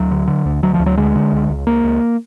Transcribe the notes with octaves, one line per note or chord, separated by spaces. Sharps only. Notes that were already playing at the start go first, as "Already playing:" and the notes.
Already playing: D2 F#3
D3
D3
D2
D2 F#3
F3
D2
F#3
D3 G#3
D3
C#2
C#2
C#2 A#3
C#2